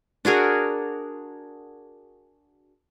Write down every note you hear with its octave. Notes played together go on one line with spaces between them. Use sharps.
D4 F#4 G#4 A#4